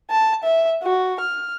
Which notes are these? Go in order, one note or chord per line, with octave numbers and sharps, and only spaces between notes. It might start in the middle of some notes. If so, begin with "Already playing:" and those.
A5
E5
F#4
F6